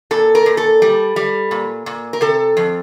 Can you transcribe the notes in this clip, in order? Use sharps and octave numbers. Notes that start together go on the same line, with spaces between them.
A#2 A4
A#4
A#2
A4
G3
G3
A#2
A#2
A#4
C3 A4
F2